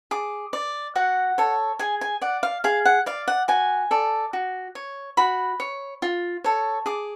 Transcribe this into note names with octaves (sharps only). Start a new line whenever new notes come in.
G#4 D6
D5
F#4 F#5
A4 C#5
G#4 G#5
G#5
D5 F#5
F5
G#4 F5
F#5
D5 F5
F#5
F#4 G#5
A4 D5
F#4
C#5
F#4 B5
C#5
F4
A4 C#5
G#4 D6